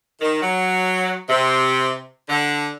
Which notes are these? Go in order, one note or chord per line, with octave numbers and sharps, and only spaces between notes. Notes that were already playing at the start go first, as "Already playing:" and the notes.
D#3
F#3
C3
D3